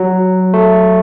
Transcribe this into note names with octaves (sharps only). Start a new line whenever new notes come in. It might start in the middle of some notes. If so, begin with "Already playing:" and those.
Already playing: F#3
A3